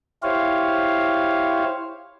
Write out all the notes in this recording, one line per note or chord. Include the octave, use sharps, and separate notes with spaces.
E4 G4 C5 C#5 F5